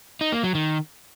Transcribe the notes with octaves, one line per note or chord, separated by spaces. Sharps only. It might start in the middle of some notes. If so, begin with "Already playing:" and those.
D#4
A#3
F#3
D#3